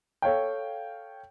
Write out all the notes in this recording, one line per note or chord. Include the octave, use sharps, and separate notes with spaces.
A4 C#5 F5 G5